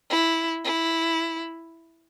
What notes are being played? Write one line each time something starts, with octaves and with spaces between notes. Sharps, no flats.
E4
E4